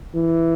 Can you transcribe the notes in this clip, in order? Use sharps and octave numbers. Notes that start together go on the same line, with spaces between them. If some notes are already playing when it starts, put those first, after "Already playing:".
E3